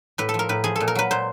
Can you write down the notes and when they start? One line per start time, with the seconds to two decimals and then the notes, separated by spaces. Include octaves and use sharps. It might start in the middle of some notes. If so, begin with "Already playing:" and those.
0.18 A2 B4
0.29 A4
0.34 F3
0.39 A#4
0.49 A2 B4
0.64 F3 G#4
0.76 A#2 A4
0.88 A#4
0.95 F#3 B4
1.11 A#2 C5